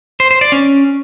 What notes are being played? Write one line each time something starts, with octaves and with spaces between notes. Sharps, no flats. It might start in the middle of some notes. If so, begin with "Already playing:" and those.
C5
C5
D5
C#4